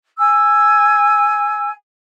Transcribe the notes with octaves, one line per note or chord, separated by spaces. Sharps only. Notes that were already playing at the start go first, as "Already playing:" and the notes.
G#5 E6